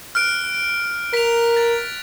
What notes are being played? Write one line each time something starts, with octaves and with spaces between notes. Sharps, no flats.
F6 F#6 D7
A#4 B6 F7
A6